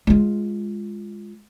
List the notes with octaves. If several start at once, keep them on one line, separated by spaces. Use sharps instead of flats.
G#3 F4